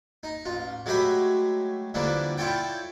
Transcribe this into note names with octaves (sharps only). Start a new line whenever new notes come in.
D#4
A1 F4
F#3 G#3 A3 G4 E5 B5
D3 E3 F3 G3 A#3 D4
E4 F4 A4 C#5 D5 G5